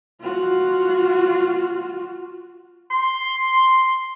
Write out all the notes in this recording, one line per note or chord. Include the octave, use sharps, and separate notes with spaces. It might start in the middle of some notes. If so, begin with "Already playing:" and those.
F4 F#4
C6